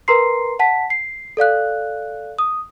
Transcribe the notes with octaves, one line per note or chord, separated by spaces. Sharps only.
A#4 B4 A#5 C6 C7
F#5 A5 B6
C7
A4 D5 F5 F#6
D#6